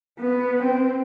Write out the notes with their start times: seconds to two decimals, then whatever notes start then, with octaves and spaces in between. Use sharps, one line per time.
0.20 B3
0.63 C4